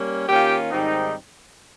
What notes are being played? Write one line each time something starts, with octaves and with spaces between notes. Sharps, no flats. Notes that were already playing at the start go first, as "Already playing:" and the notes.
Already playing: G3 A#3 C#4
D#3 A#3 C#4 F4 G4 G5
G#2 D#3 G3 C4 D#4